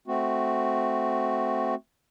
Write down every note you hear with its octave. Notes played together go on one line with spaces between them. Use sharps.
A3 C4 F#4